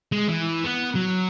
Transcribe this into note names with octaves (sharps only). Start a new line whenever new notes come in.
G#3
E3
B3
F#3